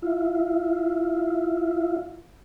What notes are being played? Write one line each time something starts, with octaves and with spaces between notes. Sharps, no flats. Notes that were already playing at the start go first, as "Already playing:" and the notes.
E4 F4